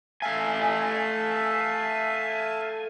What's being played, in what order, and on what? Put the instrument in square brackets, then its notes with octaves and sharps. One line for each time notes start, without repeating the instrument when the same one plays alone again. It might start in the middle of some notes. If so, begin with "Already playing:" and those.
[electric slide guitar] A3 G#5 [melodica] E5 F5 A5